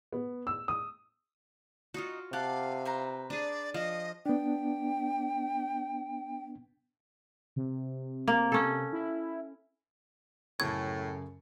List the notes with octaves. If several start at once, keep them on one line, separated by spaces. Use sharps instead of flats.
B3
E6
D#6
D#4 F4 F#4 D#5
C3 G4 F5 F#5 A5
B4 C5 A#5
D4 G#4 D5
F3 D#5 F5
B3 D4 G5
C3
A#3
C#4 A4
E4
F#2 A2 C#3 C#6 G#6